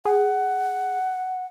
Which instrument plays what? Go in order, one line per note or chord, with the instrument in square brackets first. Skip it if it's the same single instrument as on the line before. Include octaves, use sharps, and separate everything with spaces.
[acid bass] G#4 [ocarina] F#5